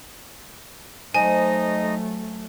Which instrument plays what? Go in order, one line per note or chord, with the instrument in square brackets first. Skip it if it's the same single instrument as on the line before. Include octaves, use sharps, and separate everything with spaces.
[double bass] F#3 A3 [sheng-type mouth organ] D#4 D#5 [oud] C5 [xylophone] G#5